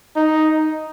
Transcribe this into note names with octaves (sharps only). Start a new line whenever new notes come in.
D#4